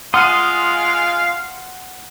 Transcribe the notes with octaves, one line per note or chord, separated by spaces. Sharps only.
G#3 F4 F5 F#5 C6 D#6 F6 D#7